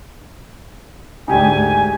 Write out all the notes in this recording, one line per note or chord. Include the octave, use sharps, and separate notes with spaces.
D2 G#2 D#4 G4 G#5